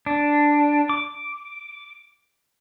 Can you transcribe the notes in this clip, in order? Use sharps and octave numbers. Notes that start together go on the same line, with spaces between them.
D4
D6